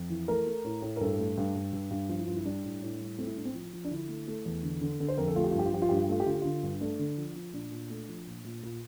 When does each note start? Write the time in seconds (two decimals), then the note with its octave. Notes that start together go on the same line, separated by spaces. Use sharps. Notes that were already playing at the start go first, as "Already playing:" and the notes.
Already playing: F2
0.10 E3
0.28 A3 A#4
0.47 A3
0.64 A2
0.82 A2
0.96 A#4
1.01 G2 A4
1.19 A3
1.37 G2
1.55 G2
1.73 G2
1.91 G2
2.09 F3 F4
2.19 E4
2.27 G2 F4
2.36 E4
2.45 G3 D4
2.64 A2
2.82 A2
3.00 G3
3.18 A3 C4
3.27 E4
3.37 A2 D4
3.45 C4
3.54 F3
3.73 F3
3.85 D4
3.91 D3 E4
4.08 A3
4.27 A3
4.46 E2
4.63 D3
4.81 D3
5.00 D3 A4
5.08 C5
5.18 F2 A#4
5.28 A4
5.36 A3 F4
5.44 G4
5.51 F4
5.54 G2 G4
5.66 F4
5.73 F3 G4
5.82 F4
5.89 G2 G4
5.97 F4
6.04 G4
6.09 A3 F4
6.20 G4
6.26 D3 F4
6.35 G4
6.42 D3 F4
6.63 G2
6.81 A3 D4
6.99 D3
7.17 F3
7.36 F3
7.53 A#2 D4
7.72 A#2
7.90 A3
8.08 F3
8.27 A#2
8.44 A#2
8.63 A#2